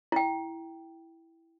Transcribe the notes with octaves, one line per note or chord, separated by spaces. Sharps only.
E4 G5